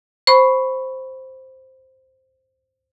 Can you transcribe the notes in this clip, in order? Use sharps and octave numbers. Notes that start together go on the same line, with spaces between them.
C5 B5 C#6